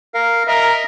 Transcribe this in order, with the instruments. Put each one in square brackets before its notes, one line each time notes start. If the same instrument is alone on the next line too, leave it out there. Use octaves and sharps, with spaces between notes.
[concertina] A#4 F5
[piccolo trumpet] A#4 [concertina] D#5 E5